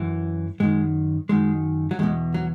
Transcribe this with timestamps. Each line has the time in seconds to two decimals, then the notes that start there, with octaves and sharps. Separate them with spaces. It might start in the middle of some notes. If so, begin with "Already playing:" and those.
Already playing: F#2 E3
0.60 F#2 D#3 G#3
1.29 F#2 D#3 G#3
1.91 F#3
1.99 E2 B2 G#3
2.34 F#3